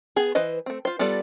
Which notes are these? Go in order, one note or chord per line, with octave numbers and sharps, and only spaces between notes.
B3 G#4
E3 B4 C5 D#5
A3 C4
F4 C5
G3 B3 F4 A4 D5